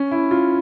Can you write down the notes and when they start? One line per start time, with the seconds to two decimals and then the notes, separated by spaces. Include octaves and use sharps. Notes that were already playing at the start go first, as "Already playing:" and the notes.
Already playing: C#4
0.11 E4
0.31 F4